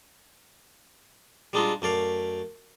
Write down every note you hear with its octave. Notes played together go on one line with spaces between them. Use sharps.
G3 G#3 D4 D#4 F4
F#2 A3 D5 F5